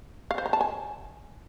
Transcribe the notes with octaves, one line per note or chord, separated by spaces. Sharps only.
F5
C5
A#5
A5
G#5